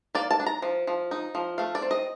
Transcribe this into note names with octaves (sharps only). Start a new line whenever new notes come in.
A#3 D5
A5
D4
A#5
F3
F3
D#4
F3
A3 F5
D5
C4
D#5